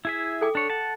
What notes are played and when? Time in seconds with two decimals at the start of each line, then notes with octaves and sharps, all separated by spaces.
0.05 E4 G#4 E5
0.41 A4 G5 D6
0.55 D4 C#5
0.70 F#5 A5